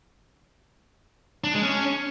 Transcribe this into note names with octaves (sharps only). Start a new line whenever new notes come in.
D4
G#3
C#4